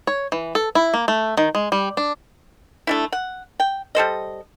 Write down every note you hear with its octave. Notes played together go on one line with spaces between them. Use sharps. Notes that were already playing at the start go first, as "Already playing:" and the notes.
C#5
E3
A4
E4
A#3
A3
D#3
G#3
G3
D4
A3 D4 E4
F#5
G5
G3 A4 C5 D#5